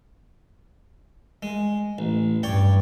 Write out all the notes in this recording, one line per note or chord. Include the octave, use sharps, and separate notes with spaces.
G#3
A1
G2 C#5 D5 G5